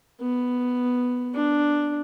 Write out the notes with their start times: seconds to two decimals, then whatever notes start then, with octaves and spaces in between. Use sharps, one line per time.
0.20 B3
1.34 D4